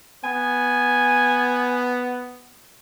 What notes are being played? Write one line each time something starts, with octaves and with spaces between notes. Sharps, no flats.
B3 G#5